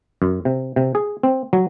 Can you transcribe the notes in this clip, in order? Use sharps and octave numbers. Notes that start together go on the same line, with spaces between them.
F#2
C3
C3
G#4
C4
F#3